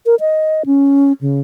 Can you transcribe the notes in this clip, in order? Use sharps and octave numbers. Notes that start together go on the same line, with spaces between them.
A#4
D#5
C#4
C#3